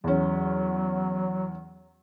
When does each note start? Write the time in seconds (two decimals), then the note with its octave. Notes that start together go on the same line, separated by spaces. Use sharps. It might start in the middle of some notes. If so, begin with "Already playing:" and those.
0.04 E2 F#3 C#4